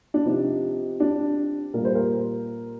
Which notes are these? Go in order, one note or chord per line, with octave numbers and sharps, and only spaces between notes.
D4
C3 F3 D#4
D4
A#2 G3 A#4
C5
A#4